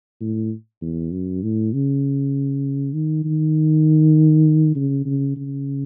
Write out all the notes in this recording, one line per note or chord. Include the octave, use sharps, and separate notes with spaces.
A2
E2
F#2
A2
C#3
D#3
D#3
C#3
C#3
C#3